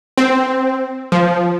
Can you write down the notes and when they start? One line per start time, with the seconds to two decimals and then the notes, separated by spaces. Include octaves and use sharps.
0.17 C4
1.12 F3